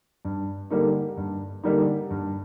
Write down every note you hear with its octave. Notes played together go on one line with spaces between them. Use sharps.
G2
D3 G3 A#3 D#4
G2
D3 G3 A#3 D#4
G2